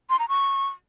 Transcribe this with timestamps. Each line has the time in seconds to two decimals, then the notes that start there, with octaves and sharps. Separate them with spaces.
0.10 C6
0.19 A#5
0.29 C#6